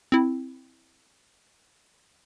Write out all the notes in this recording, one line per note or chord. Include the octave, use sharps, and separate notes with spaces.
C4 E4